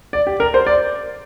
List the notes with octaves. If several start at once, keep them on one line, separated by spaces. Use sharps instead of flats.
D5
G4
A#4
C5
D5